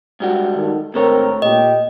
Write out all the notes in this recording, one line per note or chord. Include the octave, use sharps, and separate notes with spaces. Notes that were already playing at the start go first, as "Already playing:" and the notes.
G#2 G3 F#4
D#3 A4
G#1 D2 A3 C4 A#4 C#5
A#2 G4 D#5